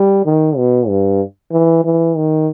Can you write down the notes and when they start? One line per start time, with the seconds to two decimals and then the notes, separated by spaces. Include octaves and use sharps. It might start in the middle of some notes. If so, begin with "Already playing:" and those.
Already playing: G3
0.25 D#3
0.57 B2
0.88 G2
1.52 E3
1.85 E3
2.16 D#3